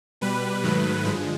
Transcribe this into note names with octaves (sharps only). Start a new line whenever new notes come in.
B2 G3 B4
G#2 D#3 F#3 A3
G2 D3 F3 G#3